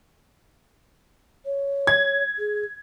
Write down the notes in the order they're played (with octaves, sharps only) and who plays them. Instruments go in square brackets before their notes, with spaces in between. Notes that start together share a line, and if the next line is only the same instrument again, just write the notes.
[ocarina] C#5
[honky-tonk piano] G#6
[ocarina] G#4